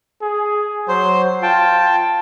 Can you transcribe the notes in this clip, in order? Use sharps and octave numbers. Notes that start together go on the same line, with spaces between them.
G#4
F#3 C5
F4 G5 A5